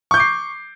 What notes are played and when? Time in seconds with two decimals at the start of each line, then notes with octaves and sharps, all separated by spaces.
0.11 C#6
0.14 G6
0.17 D6
0.20 C7